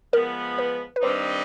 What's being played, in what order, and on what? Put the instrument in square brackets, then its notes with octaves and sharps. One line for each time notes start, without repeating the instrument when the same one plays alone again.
[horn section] F3 G#3 B3 [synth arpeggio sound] A#4
[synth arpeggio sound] B4
B4
[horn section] G2 D#3 G3 C4 D#4 [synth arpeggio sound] C5